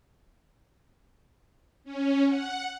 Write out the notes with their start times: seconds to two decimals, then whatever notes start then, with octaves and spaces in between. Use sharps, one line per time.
1.84 C#4
2.27 F#5